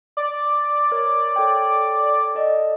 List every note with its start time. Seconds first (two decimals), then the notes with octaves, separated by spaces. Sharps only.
0.17 D5
0.92 A#4 C#5
1.36 A4 C#5 G5
2.35 A4 D5 D#5